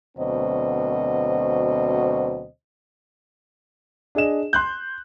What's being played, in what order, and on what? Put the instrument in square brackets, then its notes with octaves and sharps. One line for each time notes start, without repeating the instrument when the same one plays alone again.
[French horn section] D2 B2 F#3 C4 C5 D#5
[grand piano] D4 G#4 D#5 E7
C6 F#6 G6